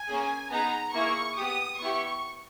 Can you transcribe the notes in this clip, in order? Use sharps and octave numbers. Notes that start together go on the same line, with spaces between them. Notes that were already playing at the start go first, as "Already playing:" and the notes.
Already playing: G#5
A#3 C#4 G#4
B3 D#4 G#4 A#5
A#3 E4 G#4 C#6
B3 G4 D#6
B3 E4 G4 C#6